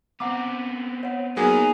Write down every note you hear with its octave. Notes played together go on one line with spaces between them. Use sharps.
B3 C4 F#5 A#5 D6
C#5 F#5
F#3 A#3 B3 D#4 G#4